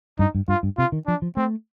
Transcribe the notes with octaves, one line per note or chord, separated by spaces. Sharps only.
G2 D#4
G2
G2 F4
G2
C3 F4
D#3
F3 D4
F3
A3 C4